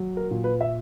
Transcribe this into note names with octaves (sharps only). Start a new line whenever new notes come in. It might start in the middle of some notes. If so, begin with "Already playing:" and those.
Already playing: F#3
A#4
A#2
B4
E5